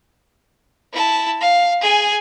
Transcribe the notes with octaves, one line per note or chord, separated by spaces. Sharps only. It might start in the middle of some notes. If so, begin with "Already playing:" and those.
E4 A5
F5
G#4 G#5